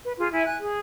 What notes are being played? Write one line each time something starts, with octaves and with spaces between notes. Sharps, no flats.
B4
F4 G#4
E4 E5 G#5
G#5 F#6
G#4